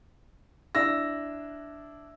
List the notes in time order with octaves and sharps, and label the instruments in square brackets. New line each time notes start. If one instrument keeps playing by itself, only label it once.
[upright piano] D4 E4 E6 A#6